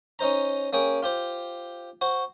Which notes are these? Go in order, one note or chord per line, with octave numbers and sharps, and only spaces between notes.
C#4 D#4 C5 A#5
A#3 C#4 G#4 G5
F4 G4 C5
F#4 C5